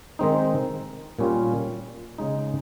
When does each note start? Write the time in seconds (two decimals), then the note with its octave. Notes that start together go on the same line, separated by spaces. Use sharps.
0.19 D#3 G#3 C4 D#4
1.19 A#2 G3 C#4 F4
2.18 C#3 G#3 D#4